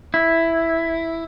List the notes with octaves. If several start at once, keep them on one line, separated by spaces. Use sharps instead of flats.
E4